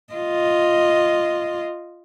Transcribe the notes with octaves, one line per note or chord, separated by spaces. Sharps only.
F4 D#5